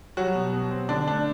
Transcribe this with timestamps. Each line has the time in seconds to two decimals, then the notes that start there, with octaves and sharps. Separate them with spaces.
0.17 F#3 G3 F#4
0.35 B2
0.52 B2
0.71 C4
0.89 D3 D4
1.07 A3 D4